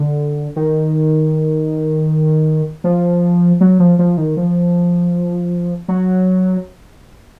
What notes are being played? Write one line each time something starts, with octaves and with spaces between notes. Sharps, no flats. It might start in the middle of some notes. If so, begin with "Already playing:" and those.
Already playing: D3
D#3
F3
F#3
F3
F3
D#3
F3
F#3